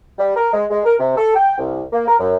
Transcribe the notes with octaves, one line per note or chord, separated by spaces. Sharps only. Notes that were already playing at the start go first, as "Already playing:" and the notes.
G3
A#4
G#3
G#3
A#4
C3
A4
G5
C2
A#3
A#4
F#2